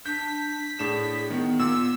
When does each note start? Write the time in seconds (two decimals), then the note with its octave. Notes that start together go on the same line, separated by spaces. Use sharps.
0.06 D4 G6 B6
0.79 A2 D4 G#4 E7
1.30 D#3 B3
1.59 A#2 E6